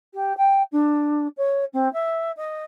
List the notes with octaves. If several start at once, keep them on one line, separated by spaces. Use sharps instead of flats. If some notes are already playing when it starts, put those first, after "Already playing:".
G4
G5
D4
C#5
C4
E5
D#5